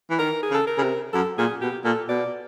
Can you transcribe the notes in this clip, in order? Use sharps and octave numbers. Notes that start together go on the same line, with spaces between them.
E3
D#3 A#4
G#4
C#3 A4
A#4
C#3
C3
F#2 A4
A#2 G#4
B2 G4
A#2 A4
B2 D5